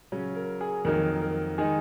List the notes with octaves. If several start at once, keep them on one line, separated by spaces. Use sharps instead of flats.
C#3 F#3 C#4
A#4
G#4
F2 D#3 F#3 A#3 A#4
A#4
D#3 G#3 D#4 G#4